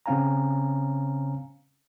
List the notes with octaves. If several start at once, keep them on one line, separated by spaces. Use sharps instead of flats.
C#3 C4 C#4 F5 G#5 A#5